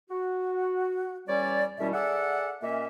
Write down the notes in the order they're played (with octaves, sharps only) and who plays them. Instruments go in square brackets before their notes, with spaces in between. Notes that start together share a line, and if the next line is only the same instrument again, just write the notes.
[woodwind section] F#4
E2 G3 C#4 C#5 D5
D#2 B2 G3 C#4 E4 E5
G#4 A4 D5 E5 F#5
A#2 A#3 C#4 D#5 E5